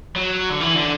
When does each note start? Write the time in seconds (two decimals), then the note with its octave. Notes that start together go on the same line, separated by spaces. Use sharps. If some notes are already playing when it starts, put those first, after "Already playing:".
0.16 F#3
0.49 D3
0.60 E3
0.76 D3